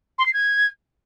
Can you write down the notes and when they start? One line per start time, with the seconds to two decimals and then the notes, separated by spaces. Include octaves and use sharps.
0.18 C6
0.26 C7
0.33 G#6